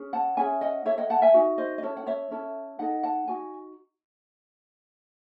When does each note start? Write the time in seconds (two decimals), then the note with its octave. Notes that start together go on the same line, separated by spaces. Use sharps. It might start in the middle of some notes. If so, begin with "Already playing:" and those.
Already playing: C#4 G#4
0.13 F#5 A5
0.37 C#4 E4 G#4 E5 G#5
0.61 D#5 F#5
0.85 E4 A4 C#5 E5
0.98 D#5 F#5
1.10 F#5 A5
1.22 E5 G#5
1.34 D#4 F#4
1.58 C5 D#5
1.78 D#5
1.82 C#4 E4 A4 C#5
1.97 F#5
2.06 C#5 E5
2.31 C#4 E4 A4
2.79 D#4 A4 D#5 F#5
3.03 F#5 A5
3.28 D#4 F#4 G#5